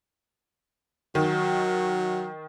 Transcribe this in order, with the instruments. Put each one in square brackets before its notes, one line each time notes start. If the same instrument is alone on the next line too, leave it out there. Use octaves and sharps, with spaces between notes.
[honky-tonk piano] D#3 [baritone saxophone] F#3